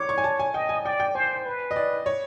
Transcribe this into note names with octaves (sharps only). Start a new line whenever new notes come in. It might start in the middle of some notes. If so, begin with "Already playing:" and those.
Already playing: C#5 D6
C#6
G#5
A5
G#5
D#5 G5
G#5
D5 G5
G5
C5 G#5
B4
D#5
D5
C#5